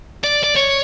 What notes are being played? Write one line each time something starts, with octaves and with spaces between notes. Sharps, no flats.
D5
D5
C#5